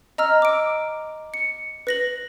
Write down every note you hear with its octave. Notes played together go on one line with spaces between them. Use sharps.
D#5 A#5 E6 F6
D6 D7
C#7
B4 A#6 F#7